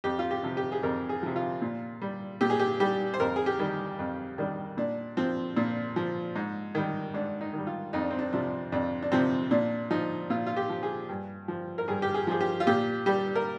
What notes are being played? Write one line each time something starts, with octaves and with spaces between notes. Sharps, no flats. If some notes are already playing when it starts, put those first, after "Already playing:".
F2 G4
F4
G4
C3 F3
G4
G#4
F2 A#4
G#4
C3 F3
F4
A#2
G3
A#2 G4
G#4
G4
G3 G4
C5
F2 A#4
G#4
G4
D#3 G3
F2
D#3 G3 D4
A#2 D4
F3 C4
A#2 D4
F3
G#2
D#3 G3
G#2 D4
D#4
D#3 G3
F4
F2 D#4
D4
C4
D4
C3 F3 D4
F2 D4
D4
C3 F3 C4
A#2 D4
F3 D#4
A#2 F4
F4
G4
F3
G#4
G2
F3
A#4
G2 G#4
G4
G#4
F3 G#4
G4
F4
A#2 G4
G3 G4
A#4